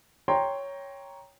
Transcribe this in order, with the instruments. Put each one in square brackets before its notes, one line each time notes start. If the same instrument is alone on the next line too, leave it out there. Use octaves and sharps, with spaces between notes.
[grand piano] C#5 G5 A#5 C6